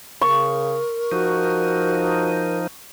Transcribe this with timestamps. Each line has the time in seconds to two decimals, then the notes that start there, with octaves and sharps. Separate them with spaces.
0.21 C#3 A#4 C#6
1.12 F3 D#4 F#4